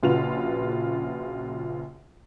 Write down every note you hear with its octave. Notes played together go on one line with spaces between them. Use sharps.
A#1 C#3 F4 F#4 B4 F7